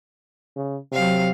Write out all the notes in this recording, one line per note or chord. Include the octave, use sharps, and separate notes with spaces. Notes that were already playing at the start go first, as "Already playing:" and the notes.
C#3
C3 F#3 F5